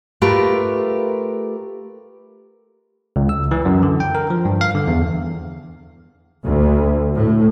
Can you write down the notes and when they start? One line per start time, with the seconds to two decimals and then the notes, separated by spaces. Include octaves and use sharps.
0.22 A3 F4 G4 A#4 B4
3.16 C#2
3.29 E6
3.51 E3
3.65 F#2
3.83 D3
4.00 G5
4.15 A#4
4.30 F3
4.45 G2
4.61 F5
4.75 D3
4.87 E2
6.47 D2
7.16 A2